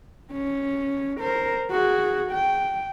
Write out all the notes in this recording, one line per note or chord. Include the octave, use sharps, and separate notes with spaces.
C#4
A#4 C5
F#4 G#4
G5